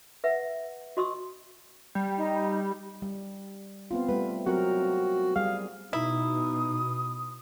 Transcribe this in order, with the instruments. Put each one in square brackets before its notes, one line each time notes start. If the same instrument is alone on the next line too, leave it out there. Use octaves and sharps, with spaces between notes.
[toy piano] B4 E5 F#5
F#4 D#5 C6 C#6 D#6 E6
[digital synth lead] G3
[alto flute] D#4
[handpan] G3
B3 C4 F4
[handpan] G3 A3 [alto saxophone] B4
[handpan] F#3 C4 A#4 [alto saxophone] F#4
[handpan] G3 G#4 [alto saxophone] F5
[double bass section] B2 [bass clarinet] D#4 [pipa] E4 [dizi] D#6